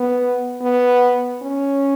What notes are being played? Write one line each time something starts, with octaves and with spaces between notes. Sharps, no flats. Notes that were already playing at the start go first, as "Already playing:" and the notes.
Already playing: B3
B3
C#4